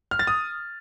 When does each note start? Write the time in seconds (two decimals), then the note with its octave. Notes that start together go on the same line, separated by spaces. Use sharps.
0.11 F6
0.19 A6
0.27 D#6